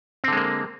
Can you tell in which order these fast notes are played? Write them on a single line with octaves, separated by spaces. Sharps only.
C4 D3 G#3 A#3